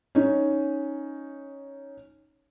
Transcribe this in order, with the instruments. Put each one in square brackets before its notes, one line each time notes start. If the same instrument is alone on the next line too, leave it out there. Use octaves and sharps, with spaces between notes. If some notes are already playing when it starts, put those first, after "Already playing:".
[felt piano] C#4 D#4